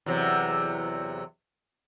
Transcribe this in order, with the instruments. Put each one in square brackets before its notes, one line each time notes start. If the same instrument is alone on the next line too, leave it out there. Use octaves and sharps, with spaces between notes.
[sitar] E2 C3 F#3